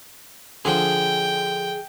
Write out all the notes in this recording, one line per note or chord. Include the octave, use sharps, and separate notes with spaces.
D3 F3 D4 G#4 G5